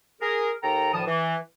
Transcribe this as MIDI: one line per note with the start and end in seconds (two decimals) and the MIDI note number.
0.22 0.50 68
0.22 0.50 70
0.63 0.93 39
0.63 0.93 69
0.63 0.93 79
0.63 0.93 82
0.93 1.02 38
0.93 1.02 45
0.93 1.02 51
0.93 1.02 53
0.93 1.02 81
0.93 1.02 87
1.06 1.36 52